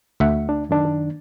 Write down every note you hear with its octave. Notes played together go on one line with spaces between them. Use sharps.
D2 E5 F#5
D4
F#2 D#3 D4